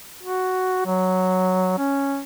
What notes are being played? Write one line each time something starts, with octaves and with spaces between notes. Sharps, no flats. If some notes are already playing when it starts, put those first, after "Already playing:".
F#4
F#3
C#4